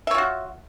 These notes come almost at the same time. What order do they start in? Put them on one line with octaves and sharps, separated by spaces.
E5 C#5 F4 F#4